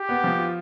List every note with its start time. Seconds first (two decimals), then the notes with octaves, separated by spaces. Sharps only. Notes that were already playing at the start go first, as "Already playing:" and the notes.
Already playing: G4
0.09 B3
0.24 F3
0.39 F4